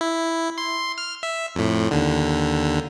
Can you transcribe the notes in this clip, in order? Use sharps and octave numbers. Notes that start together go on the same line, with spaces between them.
E4
C6
F6
E5
F2 A2
D#2 D3